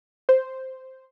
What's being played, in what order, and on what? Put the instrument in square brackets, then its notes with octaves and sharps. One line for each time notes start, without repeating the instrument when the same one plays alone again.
[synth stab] C5